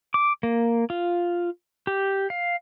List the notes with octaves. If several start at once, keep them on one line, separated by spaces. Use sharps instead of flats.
D6
A#3
F4
G4
F5